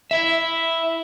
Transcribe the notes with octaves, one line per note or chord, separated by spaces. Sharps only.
E4 E5